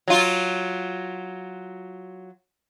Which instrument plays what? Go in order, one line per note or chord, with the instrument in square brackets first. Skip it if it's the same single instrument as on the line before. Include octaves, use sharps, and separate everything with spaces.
[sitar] F#3 F4